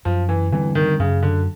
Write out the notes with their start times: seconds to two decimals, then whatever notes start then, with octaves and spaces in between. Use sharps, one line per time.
0.05 F#2 F3
0.29 E3
0.52 D3 E3 G3 C4
0.75 D#3
0.99 F#2 C#3
1.22 D3